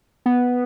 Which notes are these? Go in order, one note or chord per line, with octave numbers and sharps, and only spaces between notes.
B3